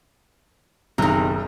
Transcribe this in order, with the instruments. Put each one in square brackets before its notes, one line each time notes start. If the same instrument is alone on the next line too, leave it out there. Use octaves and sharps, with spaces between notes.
[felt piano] F#1 B1 [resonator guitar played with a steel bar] C3 D#3